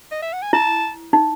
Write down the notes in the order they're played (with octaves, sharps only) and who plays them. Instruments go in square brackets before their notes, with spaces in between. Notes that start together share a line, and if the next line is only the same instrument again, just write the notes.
[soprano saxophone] D#5
E5
F#5
G#5
[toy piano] E4 [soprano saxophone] A5
[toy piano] D#4